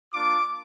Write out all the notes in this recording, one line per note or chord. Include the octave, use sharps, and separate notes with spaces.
A#3 D4 F4 D6